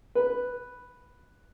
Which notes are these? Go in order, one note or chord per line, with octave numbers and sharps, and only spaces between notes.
B4